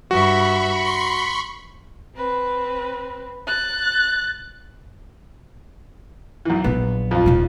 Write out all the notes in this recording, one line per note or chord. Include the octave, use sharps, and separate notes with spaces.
G2 F#4 E5 B5 C#6
C6
C4 B4
F#6 A6
B1 E3
A#1 F#3 B3
F2 F4
D#1 A#2